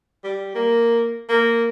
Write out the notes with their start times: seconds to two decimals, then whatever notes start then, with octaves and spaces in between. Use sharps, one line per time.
0.24 G3
0.55 A#3
1.29 A#3